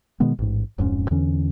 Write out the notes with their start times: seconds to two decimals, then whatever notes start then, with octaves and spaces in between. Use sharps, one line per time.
0.20 B2 D#3 G#3 B3
0.39 A1 G#2
0.78 D1 F2 G#2 C#4
1.11 E2 D3 E3 C#4